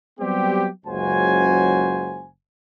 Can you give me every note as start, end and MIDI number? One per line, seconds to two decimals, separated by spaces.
0.19 0.67 54
0.19 0.67 55
0.19 0.67 59
0.19 0.67 60
0.19 0.67 67
0.86 2.27 30
0.86 2.27 37
0.86 2.27 54
0.86 2.27 66
0.86 2.27 72
0.86 2.27 80